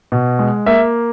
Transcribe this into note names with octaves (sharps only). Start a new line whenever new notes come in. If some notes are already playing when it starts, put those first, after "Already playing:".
B2
G#3
A#3 E5